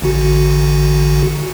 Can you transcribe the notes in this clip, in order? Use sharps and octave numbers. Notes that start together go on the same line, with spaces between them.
A1 D3 F#4